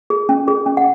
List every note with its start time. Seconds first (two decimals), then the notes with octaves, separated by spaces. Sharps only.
0.10 G#4
0.29 C#4
0.48 G#4
0.66 C#4
0.77 F#5